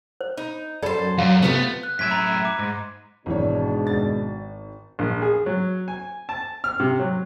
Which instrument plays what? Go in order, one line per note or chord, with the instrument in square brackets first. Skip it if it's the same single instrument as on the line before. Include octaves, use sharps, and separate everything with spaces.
[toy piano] C5
[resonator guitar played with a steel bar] D#4
[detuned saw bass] F#2 [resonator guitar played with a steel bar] A4 C5 [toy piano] D5 B5
[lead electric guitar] F#2 [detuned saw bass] F#3 [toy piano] F5
[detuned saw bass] C3 [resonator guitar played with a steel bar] A3 F4 A4 [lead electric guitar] B3
[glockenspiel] F#6
[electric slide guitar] F#2 A2 E5 [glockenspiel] G#6 B6
[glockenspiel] A#5 B5
D6
[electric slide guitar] G#2
[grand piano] G#1 E3 C#5 [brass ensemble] G#2 B2 D4
[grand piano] G#1 A6
[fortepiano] A#1
G#4
F#3
G#5
A5
F6
C3
F#3